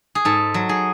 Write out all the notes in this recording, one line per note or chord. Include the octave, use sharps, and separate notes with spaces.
G#4
G#2 A4
F#3
G#4